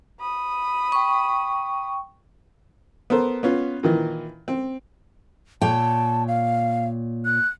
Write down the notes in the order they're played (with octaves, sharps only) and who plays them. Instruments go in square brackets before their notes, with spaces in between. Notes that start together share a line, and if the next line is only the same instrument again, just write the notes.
[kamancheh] B5 D#6
[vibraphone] G5 C#6
[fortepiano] B3 A4 A#4 C5
B3 C#4 F4
A#2 D#3 E3
C4
[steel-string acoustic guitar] A#2 C#5 G5 [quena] A5
[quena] F5
F#6